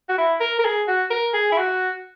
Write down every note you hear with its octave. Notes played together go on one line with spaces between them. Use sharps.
F#4
E4
A#4
A#4
G#4
F#4
A#4
G#4
E4
F#4